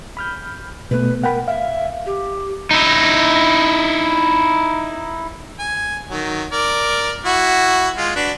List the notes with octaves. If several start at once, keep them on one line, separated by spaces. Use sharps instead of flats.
B5 F6 G6
B2 A3 B3 B4
A#4 F#5 G5 B5
E5 F5
G4
D#4 E4
G#5
D#3 F#3
A#4 D5
E4 F#4
G#3 F4
D4 F#4 B4